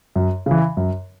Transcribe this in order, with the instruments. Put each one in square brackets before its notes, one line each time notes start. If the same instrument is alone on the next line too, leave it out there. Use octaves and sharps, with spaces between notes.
[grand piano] F#2
C#3 E3
F#2